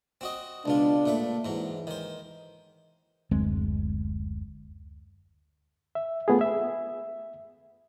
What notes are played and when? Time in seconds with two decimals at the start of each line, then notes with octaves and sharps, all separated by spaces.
0.21 C4 F#4 D#5
0.66 C#2 B2 D4 F4
1.06 A#2 A3 B4
1.45 G#2 E3 F#3
1.87 D#3 C5
3.31 F#1 D2 G#3 C4
5.95 E5
6.28 A3 B3 F4 G#4
6.41 E5